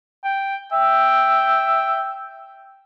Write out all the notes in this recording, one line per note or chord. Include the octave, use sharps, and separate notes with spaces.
G5
E5 G5